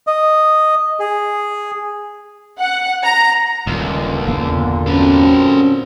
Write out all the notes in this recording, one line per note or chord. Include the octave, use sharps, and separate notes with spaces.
D#5
G#4
F#5
A#5
D#1 C#2 A#2 D3
G1 E2 A#3
F#3 C4 C#4 A4 B4